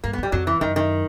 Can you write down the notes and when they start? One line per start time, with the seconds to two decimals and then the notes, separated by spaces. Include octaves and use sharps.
0.04 G2 A#3
0.13 B3
0.18 F#2 G3
0.32 F2 F#3
0.47 E3
0.61 F#2 D#3
0.76 D#3